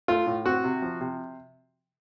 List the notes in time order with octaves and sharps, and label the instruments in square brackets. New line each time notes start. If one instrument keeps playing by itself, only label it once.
[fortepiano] A3 F4
A2
C4 F#4
C3
F3
C3